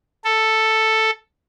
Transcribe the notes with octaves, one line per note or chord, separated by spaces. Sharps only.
A4